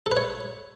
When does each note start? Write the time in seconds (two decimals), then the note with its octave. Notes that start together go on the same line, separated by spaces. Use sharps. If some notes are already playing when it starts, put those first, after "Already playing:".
0.06 A4
0.11 B4
0.17 C#5